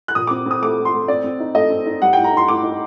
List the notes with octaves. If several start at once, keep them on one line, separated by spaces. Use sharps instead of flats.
F#6
A#2 D#6
C4 D6
C4 D#6
A3 D6
A3
C6
A3
C4 D5
C4
D#4
A3 D#5
C4
D#4
G3 F#5
A2 G5
A#5
D#4 C6
A2 D6
D#4